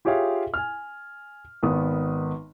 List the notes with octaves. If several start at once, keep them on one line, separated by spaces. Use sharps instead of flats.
F4 G4 G#4 C#5 E5 F5
G#5 F6
G#1 D#3 B3 D#4 D#6